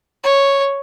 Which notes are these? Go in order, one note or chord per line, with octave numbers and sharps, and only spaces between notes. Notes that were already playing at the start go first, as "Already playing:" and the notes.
C#5